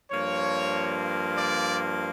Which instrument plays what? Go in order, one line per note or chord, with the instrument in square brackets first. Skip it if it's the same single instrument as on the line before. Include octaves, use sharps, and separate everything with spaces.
[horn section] G2 F3 A#3 C#5
D5